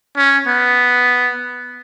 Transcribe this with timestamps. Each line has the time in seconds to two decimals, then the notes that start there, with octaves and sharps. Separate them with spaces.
0.17 C#4
0.47 B3